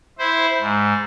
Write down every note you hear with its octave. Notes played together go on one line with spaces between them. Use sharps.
E4 C5
G#2